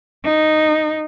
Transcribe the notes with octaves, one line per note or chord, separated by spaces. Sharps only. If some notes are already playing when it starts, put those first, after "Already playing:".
D#4